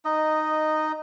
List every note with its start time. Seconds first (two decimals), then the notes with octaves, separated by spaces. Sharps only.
0.05 D#4 D#5